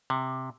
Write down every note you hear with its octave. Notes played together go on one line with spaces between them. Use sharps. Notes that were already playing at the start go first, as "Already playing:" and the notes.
C3